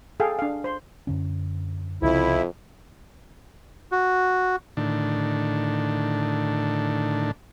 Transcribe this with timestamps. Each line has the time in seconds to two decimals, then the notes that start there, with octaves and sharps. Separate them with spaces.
0.20 G#4 A4 F5 G5
0.39 D4 F5
0.64 C5 C6
1.07 F#2 D3 C#4
2.02 C2 F2 C#3 E4
3.92 F#4
4.77 A2 D3 D#3 D4